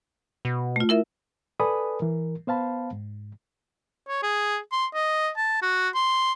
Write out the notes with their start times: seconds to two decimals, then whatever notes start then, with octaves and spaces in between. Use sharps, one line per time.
0.45 B2
0.76 A3 F4
0.89 E4 A#4 E5
1.60 A4 B4 D5 G#5 B5 D#6
2.01 E3 A#4
2.47 B3 C5 F5 A5 B5
2.93 G#2
4.08 C#5
4.23 G#4
4.72 C6
4.94 D#5
5.37 A5
5.62 F#4
5.95 C6